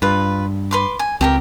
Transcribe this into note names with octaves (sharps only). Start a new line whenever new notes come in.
G2 F4 B4
B4 C6 D6
G#5
C#2 C4 G4 G#4 A#4